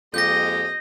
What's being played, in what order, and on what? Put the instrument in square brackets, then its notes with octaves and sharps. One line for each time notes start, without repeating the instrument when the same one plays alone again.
[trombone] F2 [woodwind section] G#3 A#3 G4 [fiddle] D#5 [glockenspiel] G6 A#6